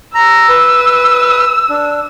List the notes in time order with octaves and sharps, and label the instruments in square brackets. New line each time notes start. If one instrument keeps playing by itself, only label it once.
[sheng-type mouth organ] A#5 [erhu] E6
[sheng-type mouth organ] B4
D4